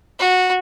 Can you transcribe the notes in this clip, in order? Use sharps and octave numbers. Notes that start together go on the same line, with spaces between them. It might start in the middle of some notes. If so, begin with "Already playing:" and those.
F#4